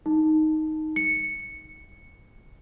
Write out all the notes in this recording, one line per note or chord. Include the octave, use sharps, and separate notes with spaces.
D#4
C#7